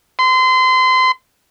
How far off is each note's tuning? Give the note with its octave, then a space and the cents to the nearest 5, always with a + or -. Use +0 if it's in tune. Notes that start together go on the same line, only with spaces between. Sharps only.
C6 -30